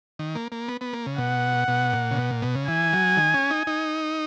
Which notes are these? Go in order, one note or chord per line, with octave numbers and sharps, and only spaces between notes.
D#3
A#3
A#3
B3
B3
A#3
C#3
B2 F#5
B2
A#2
C#3
B2
A#2
B2
C#3
E3 G#5
F#3
D#3
C#4
D#4
D#4